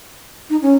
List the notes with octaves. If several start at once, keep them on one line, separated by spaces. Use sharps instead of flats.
D#4
C#4